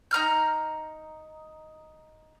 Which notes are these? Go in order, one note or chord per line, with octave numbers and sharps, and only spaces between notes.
D#4 A#5 F6 G6